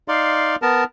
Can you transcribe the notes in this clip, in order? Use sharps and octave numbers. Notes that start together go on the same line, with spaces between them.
D#4 D5 F5 C6
B3 A#4 A5